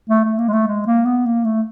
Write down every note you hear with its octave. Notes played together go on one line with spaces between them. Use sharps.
A3
A3
A#3
G#3
A3
G#3
A#3
B3
A#3
A3